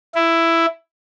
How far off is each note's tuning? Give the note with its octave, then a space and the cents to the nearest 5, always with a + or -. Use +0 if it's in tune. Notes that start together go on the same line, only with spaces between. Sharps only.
E4 +10